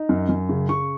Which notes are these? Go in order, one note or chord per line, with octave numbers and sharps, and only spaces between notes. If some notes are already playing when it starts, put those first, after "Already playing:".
Already playing: D#4
F#2
F#2
C#3
C#3 C#6